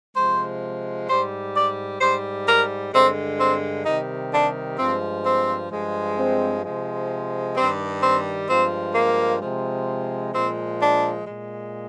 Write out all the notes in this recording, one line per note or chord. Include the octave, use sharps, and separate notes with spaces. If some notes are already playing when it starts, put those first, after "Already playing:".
C3 F3 G#3 C5
G#2 G3 C5
D5
G#2 G3 C5
A#4
G2 D3 G#3 C4
C4
C3 D#3 G3 D#4
D4
G2 F3 G#3 C4
C4
G2 F3 G#3
C4
C3 F3 G#3
G2 D#3 G3 C4
C4
G2 F3 G#3 C4
A#3
C3 F3 G#3
A#2 F3 G#3 C4
D4
A#2 G#3